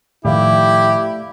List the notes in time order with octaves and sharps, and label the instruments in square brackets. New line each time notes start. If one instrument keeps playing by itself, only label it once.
[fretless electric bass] A2 D#3 F3 [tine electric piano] A3 D5 F5 [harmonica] E4 [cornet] G4